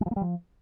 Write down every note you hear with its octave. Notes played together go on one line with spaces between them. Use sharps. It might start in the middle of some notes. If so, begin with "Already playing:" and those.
G#3
F3
A#3
G3
F3